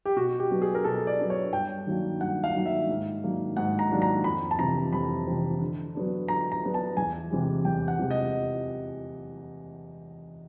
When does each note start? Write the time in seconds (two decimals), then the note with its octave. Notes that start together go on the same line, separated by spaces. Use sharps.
0.05 G4
0.16 B2 F#4
0.40 G4
0.51 F#3 B3 D4
0.62 G#4
0.75 A#4
0.84 B2 A4
1.07 D5
1.19 F#3 B3 D4
1.30 C#5
1.53 G2 G5
1.87 D#3 F#3 A#3 D4
2.21 G2 F#5
2.44 F5
2.55 D#3 F#3 A#3 D4
2.66 E5
2.89 G#2
3.23 D#3 F#3 A#3 D4
3.57 G#2 F#5
3.79 A#5
3.91 D#3 F#3 A#3 D4
4.02 A#5
4.24 F2 B5
4.51 A5
4.59 C3 E3 A#5
4.93 F2 B5
5.27 C3 E3
5.61 D3
5.95 F#3 B3 D4
6.28 D3 A#5
6.52 A#5
6.63 F#3 B3 D4
6.74 A5
6.97 E2 G#5
7.31 C3 E3 G#3
7.65 E2 G5
7.88 F#5
7.99 C3 E3 G#3
8.10 D#5